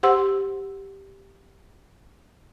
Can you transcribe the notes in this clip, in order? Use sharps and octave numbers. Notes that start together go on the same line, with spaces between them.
G4 C5 F#5 C6 E6